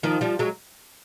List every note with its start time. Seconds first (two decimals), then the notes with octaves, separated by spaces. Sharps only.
0.03 D#3 F3
0.21 F3 G3
0.39 F#3 G#3